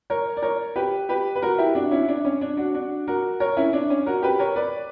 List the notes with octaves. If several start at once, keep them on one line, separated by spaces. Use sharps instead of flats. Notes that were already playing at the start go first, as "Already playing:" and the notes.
A#4 C#5
D5
A#4 C#5
G4 B4
G4 B4
B4
F#4 A#4
E4 G4
D4 F#4
C#4 E4
E4
D4
C#4
D4
D4 F#4
D4 F#4
F#4 A#4
A#4 C#5
C#4 E4
D4
C#4
F#4 A#4
G4 B4
A#4 C#5
B4 D5